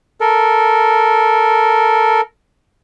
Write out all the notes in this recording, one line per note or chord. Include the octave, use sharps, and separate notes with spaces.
A4 A#4